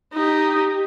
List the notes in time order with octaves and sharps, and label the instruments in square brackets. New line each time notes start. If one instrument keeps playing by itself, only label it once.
[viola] D#4 G4